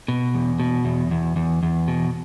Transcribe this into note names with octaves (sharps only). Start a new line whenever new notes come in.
B2
E2
B2
E2
E2
E2
E2
B2